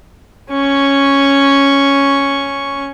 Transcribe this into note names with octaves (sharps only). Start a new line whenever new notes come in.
C#4 C#6